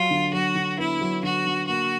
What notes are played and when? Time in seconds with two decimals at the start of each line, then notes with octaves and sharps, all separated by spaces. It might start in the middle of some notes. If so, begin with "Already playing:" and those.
Already playing: F#3 F4
0.11 D3
0.33 F#3 F#4
0.55 D3
0.79 B3 E4
1.01 F#3
1.23 D3 F#4
1.47 D3
1.68 A#3 F#4